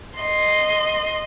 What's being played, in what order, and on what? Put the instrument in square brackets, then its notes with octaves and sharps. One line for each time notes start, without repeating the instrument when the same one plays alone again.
[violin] D#5 C6